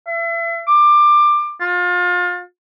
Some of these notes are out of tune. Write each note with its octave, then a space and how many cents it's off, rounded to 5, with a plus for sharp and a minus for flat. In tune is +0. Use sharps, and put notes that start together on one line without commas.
E5 +35
D6 +20
F4 +30